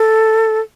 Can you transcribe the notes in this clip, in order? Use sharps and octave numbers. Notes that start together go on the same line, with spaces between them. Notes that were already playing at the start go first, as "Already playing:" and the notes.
Already playing: A4